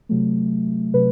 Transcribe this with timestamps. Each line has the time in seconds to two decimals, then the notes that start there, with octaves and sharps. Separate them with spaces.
0.09 C3 F#3 A3
0.94 C3 F#3 B4